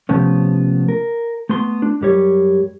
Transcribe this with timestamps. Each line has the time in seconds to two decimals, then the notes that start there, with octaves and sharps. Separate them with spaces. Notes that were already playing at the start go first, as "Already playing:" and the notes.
0.09 C3 F3 A3 B3 C#4
0.88 A#4
1.49 A3 B3 C6
1.82 D4
2.01 F#2 G3 C#5